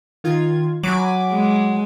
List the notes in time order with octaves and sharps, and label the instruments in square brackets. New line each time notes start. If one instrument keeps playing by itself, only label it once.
[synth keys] D#3 F4 G#6
[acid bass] F#3 [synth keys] G#5 B5 D6
[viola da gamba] G#3